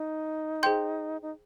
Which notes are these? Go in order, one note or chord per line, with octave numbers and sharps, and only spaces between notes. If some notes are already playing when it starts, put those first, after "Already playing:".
Already playing: D#4
G#4 C5 G5 C6 G6
D#4